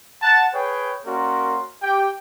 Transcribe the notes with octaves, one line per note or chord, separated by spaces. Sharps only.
F#5 A5
G#4 B4 C#5 G5
A#3 C#4 F#4 A#4 D5 C6
G4 G5